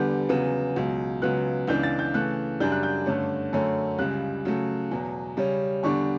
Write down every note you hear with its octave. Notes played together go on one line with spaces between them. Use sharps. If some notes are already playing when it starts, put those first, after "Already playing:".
Already playing: E2 D3 G3 B3 G6
E2 C#3 F#3 B3
C#2 B2 F#3
C#2 C#3 F#3 B3 F#6
C#2 C#3 E3 B3 D4 G6
A6
G6
C#3 E3 A3 F#6
F#2 C#3 G3 D4 G6
F#6
G6
G2 D3 A3 C#4
F#2 D3 A3 C#4
C#2 C#3 G3 F#6
C#3 F#3 A3
E2 B2 F#3
C#3 G3 C#4
E2 D3 G3 D4 C#6